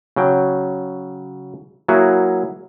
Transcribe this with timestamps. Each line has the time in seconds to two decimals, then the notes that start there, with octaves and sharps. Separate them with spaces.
0.16 C#3 F#3 G5
1.88 F#3 A#3 E4 F#4 G#4